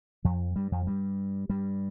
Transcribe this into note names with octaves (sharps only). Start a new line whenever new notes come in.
F2 F3
G2 G3
F2 F3
G2 G3
G2 G3